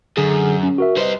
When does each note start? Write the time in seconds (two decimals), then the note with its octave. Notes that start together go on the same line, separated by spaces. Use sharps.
0.17 F#2 D3 G#4
0.63 C#4
0.78 F#4 A#4 E5
0.97 G3 B4 C5 D#5